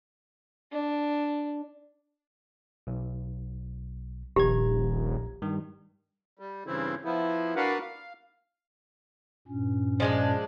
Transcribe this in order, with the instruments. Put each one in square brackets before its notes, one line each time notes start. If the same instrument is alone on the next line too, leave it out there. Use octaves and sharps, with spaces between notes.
[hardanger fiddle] D4
[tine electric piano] B1
[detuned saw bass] D#1 [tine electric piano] A#1 A#5 G#6 [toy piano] G4
[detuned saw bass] G2 [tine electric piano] D#3
[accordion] G3
G2 C#3 E3 C4 E4
F3 B3 E4
D4 F#4 A#4 B4 F5 F#5
F5
[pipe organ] G2 A#2 C#4
[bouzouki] F3 G#3 D4